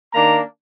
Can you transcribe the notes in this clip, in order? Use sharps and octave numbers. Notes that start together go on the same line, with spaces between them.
D#3 A#3 D4 A#5